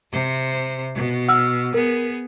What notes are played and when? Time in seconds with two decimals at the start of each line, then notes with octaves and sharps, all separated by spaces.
0.12 C3 C5
0.95 B2
1.28 F#5 E6 F6
1.74 B3 G#4 A#4